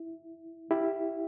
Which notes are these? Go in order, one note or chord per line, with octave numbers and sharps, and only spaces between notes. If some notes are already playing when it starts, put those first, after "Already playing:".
Already playing: E4
E4 G4